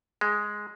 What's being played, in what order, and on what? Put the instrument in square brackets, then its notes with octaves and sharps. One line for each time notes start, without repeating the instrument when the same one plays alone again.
[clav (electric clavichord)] G#3